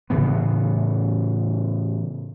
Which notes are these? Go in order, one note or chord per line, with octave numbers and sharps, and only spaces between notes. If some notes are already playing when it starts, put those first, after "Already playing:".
A2 C#3 E3 B3